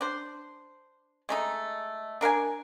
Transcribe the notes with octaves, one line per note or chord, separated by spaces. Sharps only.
D4 C5
G#3 A3 D#4
D4 A#4 F5 G#5